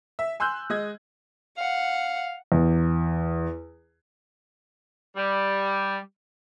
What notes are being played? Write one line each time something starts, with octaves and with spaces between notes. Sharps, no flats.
E5
G#5 C6 E6 F#6 G6
G#3 D#5 G#6
F5 F#5
E2
G3